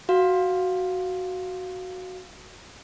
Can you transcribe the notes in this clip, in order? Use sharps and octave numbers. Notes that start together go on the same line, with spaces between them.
F#4 F5